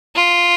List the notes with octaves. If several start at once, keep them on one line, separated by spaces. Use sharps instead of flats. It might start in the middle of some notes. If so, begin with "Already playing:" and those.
F4